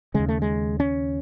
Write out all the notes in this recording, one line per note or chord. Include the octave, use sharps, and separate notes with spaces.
D#2 C#3 G#3
A3
G#3
C#4